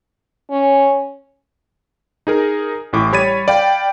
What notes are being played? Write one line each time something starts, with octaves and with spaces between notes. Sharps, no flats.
C#4
D#4 G#4 A#4
A1 A2 D6
G3 C#5 B5 G#6 A6 D#7
D5 F5 G5 B5